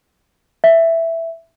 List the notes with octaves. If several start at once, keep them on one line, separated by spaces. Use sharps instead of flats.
E5